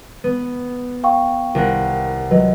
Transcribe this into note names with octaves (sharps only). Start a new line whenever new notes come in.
B3
F5 G5 C#6
C2 A#4 F#5
F#3 B4 D#5